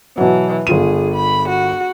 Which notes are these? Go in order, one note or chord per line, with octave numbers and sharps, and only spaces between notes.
B2 E3 F#3
G1 F4 G#4 D#7
B5
F#4